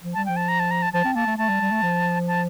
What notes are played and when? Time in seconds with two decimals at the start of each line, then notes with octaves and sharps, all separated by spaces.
0.04 F3
0.14 G3 A5
0.26 F3 G5
0.36 A5
0.48 A#5
0.60 A5
0.71 A#5
0.82 A5
0.93 F3 A5
1.05 C4
1.15 A#3 A5
1.27 A3
1.38 A3 A5
1.49 G3
1.60 G3
1.71 A3
1.82 F3
2.28 A5